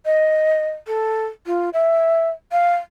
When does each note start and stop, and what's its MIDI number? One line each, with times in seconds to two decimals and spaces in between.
0.06 0.69 75
0.87 1.26 69
1.47 1.70 65
1.73 2.30 76
2.52 2.75 77